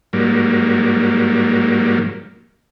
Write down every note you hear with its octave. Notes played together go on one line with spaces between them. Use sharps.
G#2 F#3 G3 A#3